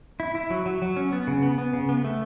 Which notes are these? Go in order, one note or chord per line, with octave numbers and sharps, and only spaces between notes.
E4
E4
F#3
F#3
F#3
C#4
B3
C#3
B3
B3
C#3
B3
A3